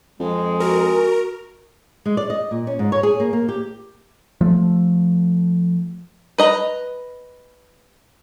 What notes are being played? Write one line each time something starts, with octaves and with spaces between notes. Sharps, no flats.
F2 G#3
F#4 A#4
G#3
D5
D#5
A#2
C#4
G#2
C#5
G#4
A#3
A#3
G4
F3 A3
B4 D#5 A#5